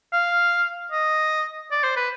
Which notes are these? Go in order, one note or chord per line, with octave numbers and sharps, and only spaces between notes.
F5
D#5
D5
C5
B4